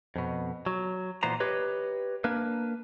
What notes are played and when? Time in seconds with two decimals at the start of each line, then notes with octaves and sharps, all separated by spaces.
0.16 F2 B2
0.66 F#3
1.23 A#2 E3 B3 C5 A#5
1.40 G4 B4 C#5 D#5
2.24 A#3 D4 A#4 B4